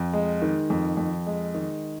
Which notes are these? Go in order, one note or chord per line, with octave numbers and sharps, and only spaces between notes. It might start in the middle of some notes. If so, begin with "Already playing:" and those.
Already playing: F2
G#3
D#3
F2
F2
G#3
D#3